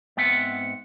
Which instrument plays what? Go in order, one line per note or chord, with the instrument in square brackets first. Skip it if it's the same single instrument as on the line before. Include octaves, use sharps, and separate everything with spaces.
[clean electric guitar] G#2 B3 C4 E5 F#5